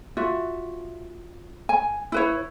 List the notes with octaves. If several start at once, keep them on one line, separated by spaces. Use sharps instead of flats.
F4 F#4 E5
G#5
E4 B4 C#5